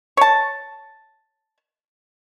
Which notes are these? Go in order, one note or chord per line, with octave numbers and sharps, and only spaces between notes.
C#5 A5